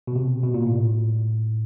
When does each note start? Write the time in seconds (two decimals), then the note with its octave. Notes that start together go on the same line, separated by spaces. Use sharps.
0.07 B2
0.16 C3
0.43 B2
0.54 A#2
0.66 A2